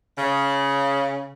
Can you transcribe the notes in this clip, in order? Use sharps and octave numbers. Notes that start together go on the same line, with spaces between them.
C#3